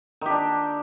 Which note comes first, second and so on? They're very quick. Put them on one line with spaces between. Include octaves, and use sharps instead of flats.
D#3 G4 D4